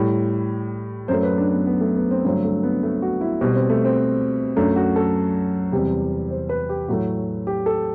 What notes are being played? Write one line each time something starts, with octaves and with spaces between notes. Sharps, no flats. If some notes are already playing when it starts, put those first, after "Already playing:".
Already playing: A2 G3
F#2 F#3 A3 C5
B4
D4
B3
B3
A3
B3
C4
G2 D3 F#3 A3 C4
A3
B3
A3
F#4
E4
B2 G3 C4
C4
A3
C4
F#2 F#3 A3 D4
F#4
A4
E2 C3 G3
C5
B4
G4
A2 F#3 A3 F#4
G4
A4